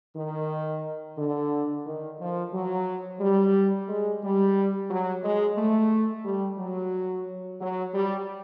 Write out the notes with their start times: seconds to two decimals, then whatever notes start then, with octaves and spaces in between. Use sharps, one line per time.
0.16 D#3
1.18 D3
1.86 D#3
2.19 F3
2.54 F#3
3.20 G3
3.88 G#3
4.22 G3
4.89 F#3
5.23 G#3
5.57 A3
6.25 G3
6.59 F#3
7.60 F#3
7.94 G3